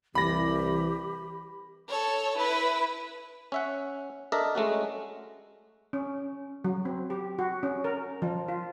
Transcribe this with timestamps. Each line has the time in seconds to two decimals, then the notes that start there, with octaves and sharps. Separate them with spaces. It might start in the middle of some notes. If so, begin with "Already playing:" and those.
0.15 C2 E3 G4 B5 A#6
1.88 A4 C#5
2.38 E4 B4
3.52 C#4 E5 F#5
4.32 D4 A4 A#4 D#5 E5
4.55 G#3 A3 C#4 F#4
5.93 C#4
6.64 F#3
6.85 C4
7.10 G4
7.39 F#4
7.63 C#4
7.84 A#4
8.22 F3
8.48 F4